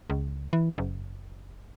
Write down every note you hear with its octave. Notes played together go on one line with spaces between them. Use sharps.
C#2
E3
F#1